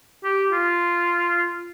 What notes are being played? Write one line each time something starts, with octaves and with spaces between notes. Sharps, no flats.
G4
F4